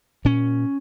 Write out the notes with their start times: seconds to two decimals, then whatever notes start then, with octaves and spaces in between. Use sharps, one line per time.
0.25 A#2 C#4